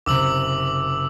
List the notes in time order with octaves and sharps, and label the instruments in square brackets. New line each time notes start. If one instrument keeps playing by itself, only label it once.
[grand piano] F#1 C3 [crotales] D6 E6 F#7